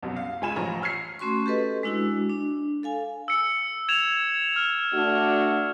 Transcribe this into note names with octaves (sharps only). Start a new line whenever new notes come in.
C2 F#2 B2
F5
C#2 G#3 F4 G#5 B5 E7
A1 F3 A#5 C#6
E6 F6 G#6 C7
A3 C#4 F#4 C6 C#6
G4 A4 B4 D#5
G#3 D4 E4 F#4 E6
D4
A4 F5 G#5
E6 C#7
G#6 E7 F7
F6
A3 D4 F#4